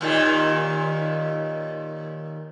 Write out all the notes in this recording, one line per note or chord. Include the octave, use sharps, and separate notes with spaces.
D#2 A#2 D#3